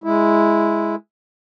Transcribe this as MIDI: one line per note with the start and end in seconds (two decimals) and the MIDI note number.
0.04 0.95 56
0.04 0.95 64